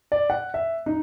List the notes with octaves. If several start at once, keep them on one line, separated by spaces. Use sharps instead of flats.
D5
F#5
E5
D#4